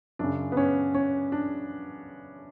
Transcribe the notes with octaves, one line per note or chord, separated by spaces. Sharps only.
F#2 C#3 D4
B3
C#4
C#4
D4